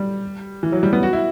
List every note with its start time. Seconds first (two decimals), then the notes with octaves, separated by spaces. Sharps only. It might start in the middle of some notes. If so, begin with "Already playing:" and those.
Already playing: G3
0.63 E3
0.72 F#3
0.83 G3
0.93 B3
1.03 F#4
1.13 E4